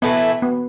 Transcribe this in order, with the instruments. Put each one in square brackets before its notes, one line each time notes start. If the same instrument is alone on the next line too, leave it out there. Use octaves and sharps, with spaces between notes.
[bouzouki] A2 E3 A3 E4 [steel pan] B3
[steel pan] B3